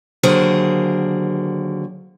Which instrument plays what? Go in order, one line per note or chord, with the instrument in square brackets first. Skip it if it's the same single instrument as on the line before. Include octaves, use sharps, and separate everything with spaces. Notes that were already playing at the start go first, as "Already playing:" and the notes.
[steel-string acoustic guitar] D#2 D3 F#3 G#4 A#4 C5